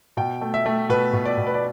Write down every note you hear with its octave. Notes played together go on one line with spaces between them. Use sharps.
B2 G5
A3
E5
A3
B2 B4
B2
D5
B2
B4
D5